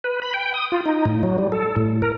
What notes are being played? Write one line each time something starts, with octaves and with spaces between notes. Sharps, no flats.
B4
B5
G5
D#6
F4
D#4
A2
F#3
G3
A4
A2
A#4